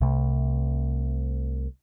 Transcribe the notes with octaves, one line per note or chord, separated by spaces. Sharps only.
C2 C3 A3